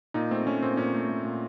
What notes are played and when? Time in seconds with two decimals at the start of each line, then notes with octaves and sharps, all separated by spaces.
0.14 A#2 D#4
0.31 A3 C4
0.46 A3 C#4
0.62 A#2 C4
0.77 A#2 C#4
0.94 A3
1.09 A3
1.25 A#2